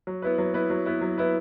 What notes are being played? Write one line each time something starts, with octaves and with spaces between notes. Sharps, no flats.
F#3
B3 E4 B4
F#3
B3 E4 B4
F#3
B3 E4 B4
F#3
B3 E4 B4